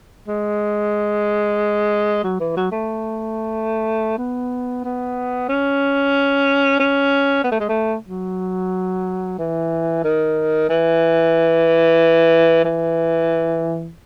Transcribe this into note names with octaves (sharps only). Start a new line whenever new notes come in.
G#3
F#3
E3
F#3
A3
B3
B3
C#4
C#4
B3
A3
G#3
A3
F#3
E3
D#3
E3
E3